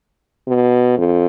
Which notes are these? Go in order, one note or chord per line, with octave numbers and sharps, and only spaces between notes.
B2
F2